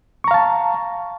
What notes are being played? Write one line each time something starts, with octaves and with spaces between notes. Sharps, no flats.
F5 A5 A#5 C#6